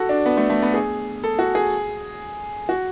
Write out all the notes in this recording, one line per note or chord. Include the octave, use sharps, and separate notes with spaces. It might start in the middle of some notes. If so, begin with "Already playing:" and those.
Already playing: F#4 A4
D4
B3
A3
A3
B3
G#4
A4
F#4
G#4
F#4